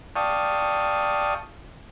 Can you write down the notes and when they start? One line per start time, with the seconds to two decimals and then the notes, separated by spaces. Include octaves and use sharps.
0.16 D5 F5 G5 A5 C#6 D#6